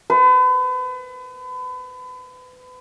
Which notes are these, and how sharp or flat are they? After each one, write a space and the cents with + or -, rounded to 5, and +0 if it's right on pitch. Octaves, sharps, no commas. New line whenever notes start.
B4 +35